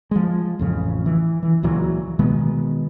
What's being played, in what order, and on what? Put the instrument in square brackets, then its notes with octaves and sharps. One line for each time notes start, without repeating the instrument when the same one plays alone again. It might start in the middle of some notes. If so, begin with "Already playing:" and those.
[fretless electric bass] F3 G#3
A1 F2 C#3
E3
E3
C#2 A#2 E3 F#3
B2 D#3 G#3 B3